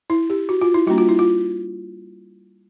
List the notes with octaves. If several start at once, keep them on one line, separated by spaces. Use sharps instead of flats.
E4
G4
F#4
F4
E4
G3 A#3 D4 F#4
F4
E4
F4